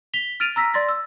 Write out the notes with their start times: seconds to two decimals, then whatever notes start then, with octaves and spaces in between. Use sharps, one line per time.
0.14 B6 F7 G7
0.40 F6 A6 D7 D#7 F7
0.56 A#5 E6 A#6 B6
0.74 D5 C6 A6 A#6
0.89 E6